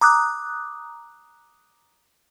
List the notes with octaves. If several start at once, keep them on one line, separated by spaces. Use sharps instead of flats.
A#5 D6 D#6 F#6